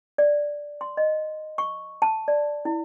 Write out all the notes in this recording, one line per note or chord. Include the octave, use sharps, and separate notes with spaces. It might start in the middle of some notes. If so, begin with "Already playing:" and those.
D5
C6
D#5
C#6
A5
D5
E4